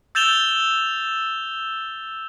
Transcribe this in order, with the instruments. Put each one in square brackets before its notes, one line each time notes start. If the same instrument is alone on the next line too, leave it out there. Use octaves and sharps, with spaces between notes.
[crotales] E6 G6 A6 E7 F7 G7